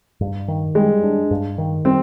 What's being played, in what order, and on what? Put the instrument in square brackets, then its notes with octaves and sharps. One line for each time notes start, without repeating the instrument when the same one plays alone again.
[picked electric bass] G2
D#3
[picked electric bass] G3 [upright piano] G#3
[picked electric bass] D4
G2
D#3
[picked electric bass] G3 [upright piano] C4